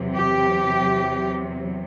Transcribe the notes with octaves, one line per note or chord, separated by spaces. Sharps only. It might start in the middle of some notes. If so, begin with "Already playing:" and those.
Already playing: E2 C3 F#3
G4